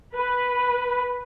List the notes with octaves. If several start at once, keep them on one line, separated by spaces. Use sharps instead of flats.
B4